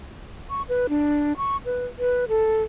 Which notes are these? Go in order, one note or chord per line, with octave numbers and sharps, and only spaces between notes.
C#6
B4
D4
C#6
B4
B4
A4